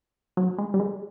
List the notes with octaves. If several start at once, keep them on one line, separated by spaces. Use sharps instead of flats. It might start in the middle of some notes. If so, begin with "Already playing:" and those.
F#3
G#3
G3
G#3